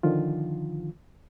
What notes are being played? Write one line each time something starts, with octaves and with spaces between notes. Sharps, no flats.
D3 D#3 F3 F4